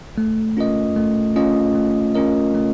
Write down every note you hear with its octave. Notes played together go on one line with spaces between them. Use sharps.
A3
C#4 F4 A#4 D#5
A3
C#4 F4 A#4 D#5
A3
C#4 F4 A#4 D#5
A3